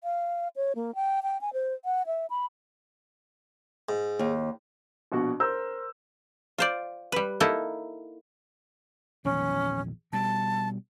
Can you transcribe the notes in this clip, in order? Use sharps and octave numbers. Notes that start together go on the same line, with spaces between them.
F5
C#5
A#3
G5
G5
G#5
C5
F#5
E5
B5
G#2
D#2
A#1 B2 F#4 C#6
A#4 C5 A#5 E6 G6
F4 C5 D5
G3 B4
A#3 D#4 E4 A4
A#1 E2 D#3 C#4
B2 G3 A5